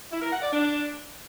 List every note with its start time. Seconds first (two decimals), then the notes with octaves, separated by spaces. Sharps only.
0.12 E4
0.22 A#4
0.32 F#5
0.42 D5
0.52 D4